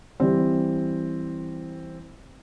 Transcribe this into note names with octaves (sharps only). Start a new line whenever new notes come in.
E3 G3 C4